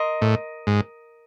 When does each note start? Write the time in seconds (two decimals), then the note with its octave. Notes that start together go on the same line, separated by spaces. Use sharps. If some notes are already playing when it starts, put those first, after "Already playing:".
Already playing: A#4 D#5 C6
0.21 A2
0.67 G#2